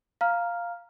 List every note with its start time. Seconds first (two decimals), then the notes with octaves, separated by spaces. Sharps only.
0.21 F5 A#5 F6